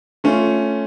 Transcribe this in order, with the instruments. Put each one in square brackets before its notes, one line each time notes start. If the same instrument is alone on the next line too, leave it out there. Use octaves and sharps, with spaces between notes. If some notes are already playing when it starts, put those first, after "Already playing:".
[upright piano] A3 C#4 F4